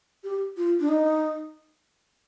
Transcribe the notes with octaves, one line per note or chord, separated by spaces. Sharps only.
G4
F4
D4
D#4